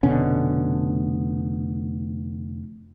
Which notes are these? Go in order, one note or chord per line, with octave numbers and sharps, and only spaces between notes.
F1 B2 D3 C#4